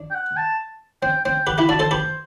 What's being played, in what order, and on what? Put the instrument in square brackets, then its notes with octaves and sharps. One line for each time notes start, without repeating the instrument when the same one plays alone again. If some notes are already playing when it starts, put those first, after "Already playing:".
Already playing: [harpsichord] D4
[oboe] G5
F#5
A5
[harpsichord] C4 [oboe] G5
[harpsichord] C4 [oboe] G5
[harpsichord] G4 B4 [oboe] F#5
[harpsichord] E4 G4 [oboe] B5
[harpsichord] D4 F#4 [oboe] A5
[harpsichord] A4 C5 [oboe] A5
[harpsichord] G4 B4 [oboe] C5